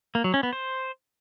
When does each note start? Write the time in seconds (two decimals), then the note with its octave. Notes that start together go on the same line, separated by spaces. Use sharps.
0.15 A#3
0.24 F#3
0.34 C#4
0.43 B3
0.53 C5